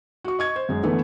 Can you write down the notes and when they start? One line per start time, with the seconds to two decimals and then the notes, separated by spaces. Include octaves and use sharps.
0.24 F#4 C#6
0.39 D#5 C#6 G#6
0.56 C5
0.69 F#2 G#3
0.83 D3 E3 A3 B3